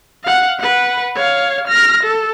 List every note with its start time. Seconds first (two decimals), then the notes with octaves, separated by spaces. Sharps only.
0.24 F5 F#5
0.60 B4 F#5
1.15 C#5 F5
1.68 F6 A#6
2.03 A4